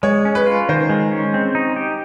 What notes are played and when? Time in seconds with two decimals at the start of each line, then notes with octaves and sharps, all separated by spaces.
0.03 G#3 C#5
0.25 C#4
0.35 B4
0.47 F4
0.69 D#3 C5
0.90 G#3
1.12 C#4
1.34 C4
1.55 D#4
1.76 G4